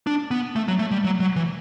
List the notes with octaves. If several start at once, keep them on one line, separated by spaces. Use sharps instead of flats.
D4
B3
A3
F#3
A3
G3
F#3
F#3
E3